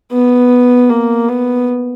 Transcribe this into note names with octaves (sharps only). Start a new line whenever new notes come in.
B3
A#3
B3